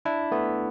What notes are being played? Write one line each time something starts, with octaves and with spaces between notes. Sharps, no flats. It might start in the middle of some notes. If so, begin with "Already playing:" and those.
D4 E4
A3 B3